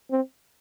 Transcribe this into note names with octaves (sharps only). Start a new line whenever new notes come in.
C4